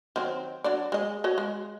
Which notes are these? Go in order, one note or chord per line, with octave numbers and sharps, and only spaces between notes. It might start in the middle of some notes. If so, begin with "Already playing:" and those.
D#3 F#3 C4
F#3 D4 D5
G#3 D#5
F#4 C#5 D#5
G#3